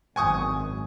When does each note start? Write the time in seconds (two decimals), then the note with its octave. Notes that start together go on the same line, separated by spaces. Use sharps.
0.16 G#1 F#2 G#5 C#6 D#6